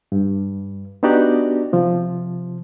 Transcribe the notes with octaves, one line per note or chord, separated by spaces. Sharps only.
G2
B3 D4 D#4 F#4 G4 D5
C3 F3